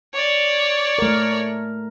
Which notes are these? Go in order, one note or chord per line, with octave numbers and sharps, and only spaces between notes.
C#5 D5
A3 A#4